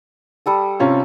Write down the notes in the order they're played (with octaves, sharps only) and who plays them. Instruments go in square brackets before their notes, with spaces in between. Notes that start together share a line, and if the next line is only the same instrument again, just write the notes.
[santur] G3 A4 D#6
[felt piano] C3 C#4 F4